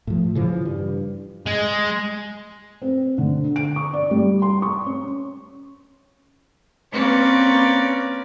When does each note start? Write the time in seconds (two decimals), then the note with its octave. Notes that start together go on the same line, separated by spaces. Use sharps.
0.07 A2 F3
0.35 C#3 E3 F3
0.65 G2
1.46 G#3
2.82 C4
3.18 D3
3.56 D7
3.76 C#6
3.93 D5
4.11 G3
4.42 C6
4.62 C#6
4.86 C#4
6.92 A#3 C4 C#4 B4 C#5 D5